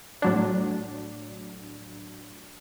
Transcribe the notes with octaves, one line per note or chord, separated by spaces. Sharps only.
A2 F#3 D4